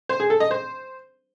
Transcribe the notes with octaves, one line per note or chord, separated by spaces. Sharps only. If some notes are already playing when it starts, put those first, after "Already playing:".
C5
G#4
A4
D#5
C5